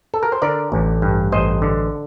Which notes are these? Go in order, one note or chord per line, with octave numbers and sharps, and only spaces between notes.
A4
A#4
C5
D3 A#4 D5
A1
G2
A1 C5 D#5
D3